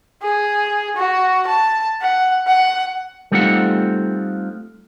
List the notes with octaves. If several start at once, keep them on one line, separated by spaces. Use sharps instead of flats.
G#4
F#4
A5
F#5
F#5
G3 A3 C4 D#4 F4 F#5